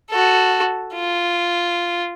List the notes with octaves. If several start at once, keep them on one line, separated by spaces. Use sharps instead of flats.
F#4 A4
F4